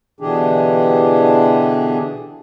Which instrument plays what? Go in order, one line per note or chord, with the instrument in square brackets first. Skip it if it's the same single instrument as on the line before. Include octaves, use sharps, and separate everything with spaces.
[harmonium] B2 D3 E3 D4 G4 G#4